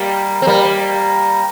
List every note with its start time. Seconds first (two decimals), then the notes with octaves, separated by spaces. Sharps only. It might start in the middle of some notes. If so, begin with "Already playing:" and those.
Already playing: G3 A#3
0.42 C4
0.47 G3 A#3